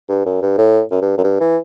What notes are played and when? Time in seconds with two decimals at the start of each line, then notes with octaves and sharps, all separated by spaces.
0.09 G2
0.26 F#2
0.42 G2
0.58 A2
0.91 F#2
1.02 G2
1.18 F#2
1.24 G2
1.40 E3